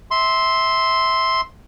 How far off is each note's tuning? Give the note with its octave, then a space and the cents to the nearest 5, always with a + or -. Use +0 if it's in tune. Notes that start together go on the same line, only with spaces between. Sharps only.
E5 -15 C6 +0